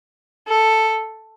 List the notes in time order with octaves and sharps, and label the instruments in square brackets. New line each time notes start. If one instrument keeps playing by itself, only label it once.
[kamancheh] A4